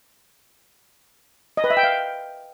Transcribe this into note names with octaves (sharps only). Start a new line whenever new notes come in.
D#5
B4
E5
G5
F5